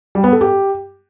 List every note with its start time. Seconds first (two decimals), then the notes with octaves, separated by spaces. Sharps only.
0.15 G3
0.24 B3
0.32 A4
0.41 G4